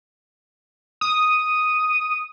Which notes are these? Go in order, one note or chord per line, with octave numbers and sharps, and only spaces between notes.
D#6